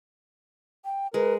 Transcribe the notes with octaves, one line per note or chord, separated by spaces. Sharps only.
G5
G#3 A#4 B4